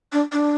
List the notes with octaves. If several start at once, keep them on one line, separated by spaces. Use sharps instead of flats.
D4
D4